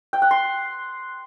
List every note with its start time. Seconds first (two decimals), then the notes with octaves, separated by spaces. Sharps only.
0.13 G5
0.22 F#5
0.31 C6